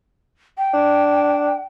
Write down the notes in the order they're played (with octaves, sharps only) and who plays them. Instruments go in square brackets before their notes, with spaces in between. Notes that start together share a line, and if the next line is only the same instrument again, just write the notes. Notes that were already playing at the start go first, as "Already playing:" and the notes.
[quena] G5
[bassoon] D4